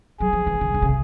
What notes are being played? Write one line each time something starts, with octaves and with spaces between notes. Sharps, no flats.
F#3 G#4
F3
E3
D3
D3
C#3